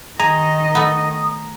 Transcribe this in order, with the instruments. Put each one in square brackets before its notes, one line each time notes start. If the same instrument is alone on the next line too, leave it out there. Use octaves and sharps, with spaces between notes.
[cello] D#3 D#5 [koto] G#4 [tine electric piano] A#5
[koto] A3 B3 [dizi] D#6